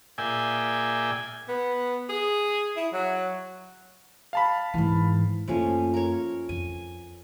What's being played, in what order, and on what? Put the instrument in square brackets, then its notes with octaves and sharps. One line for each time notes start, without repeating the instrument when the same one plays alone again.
[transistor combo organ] A#2 G#4 D5 E5 G5 G#5
[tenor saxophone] B3
G#4
E4
F#3
[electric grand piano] F5 A5 B5
[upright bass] G#2 E3
[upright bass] F#2 A#3 [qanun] F3 A3 C#4
[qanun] A#4 C#5
[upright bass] F2 [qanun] G#5